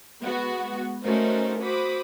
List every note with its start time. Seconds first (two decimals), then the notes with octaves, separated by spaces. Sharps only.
0.23 G#3 B3 F#4
1.04 A3 C#4 D#4 F#4 A#4 C5
1.62 F#4 C5 B5 D6 D#6